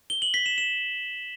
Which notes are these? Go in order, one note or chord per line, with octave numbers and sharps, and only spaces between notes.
G7
F#7
B6
E7
E7